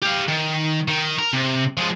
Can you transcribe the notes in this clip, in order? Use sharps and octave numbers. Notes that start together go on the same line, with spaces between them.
G4 F5
D#3
D#3
A#4
C3
F3 G#3